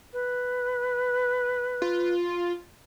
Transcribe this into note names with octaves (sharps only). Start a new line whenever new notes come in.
B4
F4